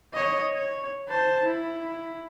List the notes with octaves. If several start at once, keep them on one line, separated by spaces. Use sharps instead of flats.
C#5 D#5
C#5
C5 A5
E4